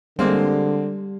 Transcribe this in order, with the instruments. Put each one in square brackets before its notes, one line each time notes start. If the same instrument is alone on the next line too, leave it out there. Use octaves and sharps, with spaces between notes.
[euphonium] D3 [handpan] G3 [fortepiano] G#3 A#3 C4